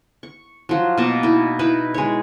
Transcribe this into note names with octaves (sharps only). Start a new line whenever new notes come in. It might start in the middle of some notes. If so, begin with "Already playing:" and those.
C#6
F3 F#3
B2 A#3 D#5 A5
D#4 E4
D#4 E4 B4
G#3 C#5